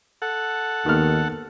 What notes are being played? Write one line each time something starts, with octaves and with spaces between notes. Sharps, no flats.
A4 F#5
D#2 D#3 B3 F6